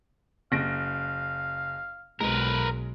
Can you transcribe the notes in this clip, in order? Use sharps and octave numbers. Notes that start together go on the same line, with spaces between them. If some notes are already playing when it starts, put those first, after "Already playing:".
F#1 F5 A#6 D7
B1 G#3 A#4 B4